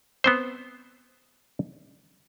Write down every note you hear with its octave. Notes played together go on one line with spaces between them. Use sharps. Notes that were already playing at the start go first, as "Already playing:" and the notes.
B3 C4 C5